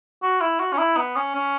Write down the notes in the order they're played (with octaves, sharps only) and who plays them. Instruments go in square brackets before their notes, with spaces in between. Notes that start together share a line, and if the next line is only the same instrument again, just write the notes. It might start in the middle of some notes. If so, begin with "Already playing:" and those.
[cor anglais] F#4
E4
F#4
C#4
E4
B3
C#4
C#4